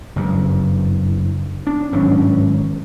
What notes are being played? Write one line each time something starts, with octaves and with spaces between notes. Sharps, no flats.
F#1 G2
D4
G#1 G2 F#3 C#4